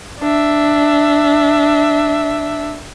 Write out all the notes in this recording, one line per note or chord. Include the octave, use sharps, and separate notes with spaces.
D4 E5